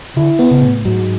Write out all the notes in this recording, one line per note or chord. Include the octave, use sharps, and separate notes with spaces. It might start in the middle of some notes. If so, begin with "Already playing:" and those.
D3 E4
B3
C#3
A2
G#2 F#3